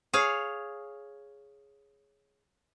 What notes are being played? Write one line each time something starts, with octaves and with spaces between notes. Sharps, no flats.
G#4 C#5 F5